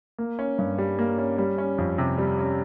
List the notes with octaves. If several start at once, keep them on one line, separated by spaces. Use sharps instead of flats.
A#3
C#4
G2
G3
A#3
C#4
G3
C#4
F2
C3
G3
C#4